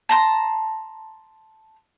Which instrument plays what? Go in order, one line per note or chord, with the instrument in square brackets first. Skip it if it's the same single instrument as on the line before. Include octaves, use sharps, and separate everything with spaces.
[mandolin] A5 A#5 C6